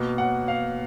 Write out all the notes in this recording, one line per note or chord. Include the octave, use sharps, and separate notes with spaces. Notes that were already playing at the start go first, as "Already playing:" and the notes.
Already playing: B2 A#3
F#5
F5